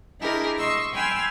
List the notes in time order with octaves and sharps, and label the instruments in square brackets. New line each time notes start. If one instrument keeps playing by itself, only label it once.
[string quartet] D4 E4 G4 G#4 A#4 D#5
D#5 C6 C#6 E6
G5 G#5 B5 C6 E6 F6